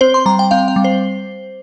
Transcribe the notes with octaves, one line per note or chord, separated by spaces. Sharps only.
C4 C5
C6
G3 A#5
G5
C4 F5
F5
G3
C5